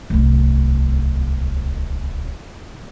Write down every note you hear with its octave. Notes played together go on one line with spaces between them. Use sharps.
D1 C2